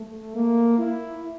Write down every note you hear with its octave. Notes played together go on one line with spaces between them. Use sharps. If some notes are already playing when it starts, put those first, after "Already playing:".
Already playing: A3
A#3
E4